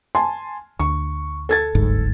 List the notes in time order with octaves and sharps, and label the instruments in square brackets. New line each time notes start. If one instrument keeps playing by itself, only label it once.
[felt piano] G#5 A5 C6
[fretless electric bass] D2 [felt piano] C#6
[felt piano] A4 G#6 A6
[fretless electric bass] D1 G1 G#2